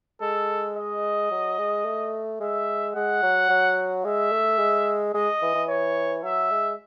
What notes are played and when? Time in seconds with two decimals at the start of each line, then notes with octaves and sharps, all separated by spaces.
0.22 G#3 A4
0.76 D#5
1.31 F#3
1.58 G#3
1.85 A3
2.40 G#3 E5
2.95 G#3 F#5
3.23 F#3
3.50 F#3
4.05 G#3 E5
4.32 A3
4.59 G#3
5.14 G#3 D#5
5.42 E3
5.55 E3
5.69 C#5
6.23 F#3 E5
6.51 G#3